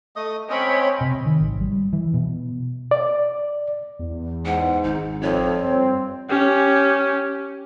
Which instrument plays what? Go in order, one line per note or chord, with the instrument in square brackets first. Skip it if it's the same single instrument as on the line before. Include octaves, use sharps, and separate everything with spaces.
[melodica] A3 D#5 D#6
[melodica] C4 C#4 D#5 [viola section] C#5 G5 B5
[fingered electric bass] C3
D#3
G#1
G3
E3
B2
[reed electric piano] D5
[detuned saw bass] E2
[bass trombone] G#2 [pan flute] F#5
[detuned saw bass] G#1 [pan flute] D#4
[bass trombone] F2 [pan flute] C#5
[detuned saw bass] G2 [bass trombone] C4
[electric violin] C#4 G4